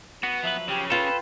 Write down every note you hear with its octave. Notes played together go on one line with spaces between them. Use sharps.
B3 F#4
F3 F#3 B4 E5
C#3 G4
F4 A4 B4 G5